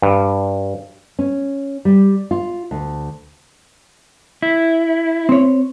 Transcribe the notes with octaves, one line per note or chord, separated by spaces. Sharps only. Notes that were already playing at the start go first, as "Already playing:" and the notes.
G2
C#4
G3
F4
D2
E4
C4 C#5